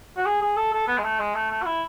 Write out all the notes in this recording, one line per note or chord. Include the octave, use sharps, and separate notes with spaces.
F#4
G#4
G#4
A4
A4
B3
G#3
A3
G#3
A3
A3
F#4
E4